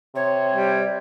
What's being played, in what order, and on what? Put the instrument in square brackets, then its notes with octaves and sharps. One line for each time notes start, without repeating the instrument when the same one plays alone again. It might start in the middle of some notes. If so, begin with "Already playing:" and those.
[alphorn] C3 [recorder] C#5
[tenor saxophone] G3